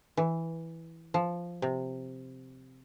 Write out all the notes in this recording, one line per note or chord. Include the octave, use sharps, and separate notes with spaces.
E3
F3
C3